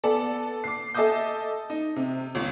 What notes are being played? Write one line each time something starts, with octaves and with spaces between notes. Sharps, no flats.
B3 A4 D5
D6 C7
A4 D#5 E5 D6 D#6 G6
D#4
C3
G1 C#2